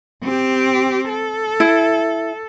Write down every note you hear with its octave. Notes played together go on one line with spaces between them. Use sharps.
C4 G4
A4
E4